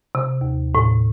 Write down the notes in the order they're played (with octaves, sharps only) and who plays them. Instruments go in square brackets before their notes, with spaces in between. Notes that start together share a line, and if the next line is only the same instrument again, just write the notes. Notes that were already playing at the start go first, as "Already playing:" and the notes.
[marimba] C3
D#2
A2